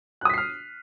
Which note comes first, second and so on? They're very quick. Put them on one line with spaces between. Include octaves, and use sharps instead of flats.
F#6 D#6 B6 C7 F6